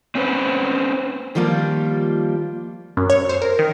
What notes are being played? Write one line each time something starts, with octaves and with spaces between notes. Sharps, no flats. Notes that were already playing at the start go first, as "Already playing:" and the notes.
C4 C#4 B4 C5
D#3 F3 G3 A#3 F4
F#2
C#5
C5
A#4
D#3